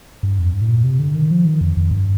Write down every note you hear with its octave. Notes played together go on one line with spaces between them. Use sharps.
G2
F2
G2
A2
A#2
C3
D3
D#3
F3
D#3
F2
F2
G2